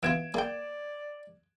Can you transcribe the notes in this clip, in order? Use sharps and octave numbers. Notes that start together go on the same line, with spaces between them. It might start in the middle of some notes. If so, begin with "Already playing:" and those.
E3 B3 F4 G#6 D7 E7
A#3 G#4 D5 G5